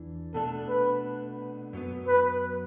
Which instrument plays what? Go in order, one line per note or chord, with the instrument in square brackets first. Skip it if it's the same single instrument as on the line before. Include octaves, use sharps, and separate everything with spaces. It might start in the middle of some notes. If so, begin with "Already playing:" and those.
Already playing: [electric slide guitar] E2 E3 D4
[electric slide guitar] B2 A3 D4 [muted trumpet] A4
[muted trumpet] B4
[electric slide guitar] F#2 F#3 B3
[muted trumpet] B4